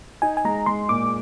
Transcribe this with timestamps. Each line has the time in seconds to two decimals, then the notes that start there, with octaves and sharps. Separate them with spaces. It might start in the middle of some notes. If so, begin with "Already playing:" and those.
0.22 D#4 G#5
0.37 G#5
0.45 G#3 A#5
0.66 G#3 C6
0.89 A#2 D6